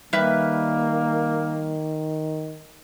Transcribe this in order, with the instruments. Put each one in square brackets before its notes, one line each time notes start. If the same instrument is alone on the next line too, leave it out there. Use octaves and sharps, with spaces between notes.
[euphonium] D#3 [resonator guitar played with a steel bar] G3 B4 E5 [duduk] A#3